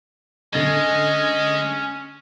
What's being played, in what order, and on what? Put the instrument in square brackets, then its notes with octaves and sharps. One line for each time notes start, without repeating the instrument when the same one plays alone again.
[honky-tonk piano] D3 A6 D#7 [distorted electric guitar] G#3 [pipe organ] C#4 [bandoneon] D#5